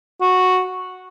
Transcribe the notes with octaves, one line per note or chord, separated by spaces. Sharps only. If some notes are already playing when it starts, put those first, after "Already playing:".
F#4